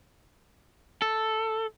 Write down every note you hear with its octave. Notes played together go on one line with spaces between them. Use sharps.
A4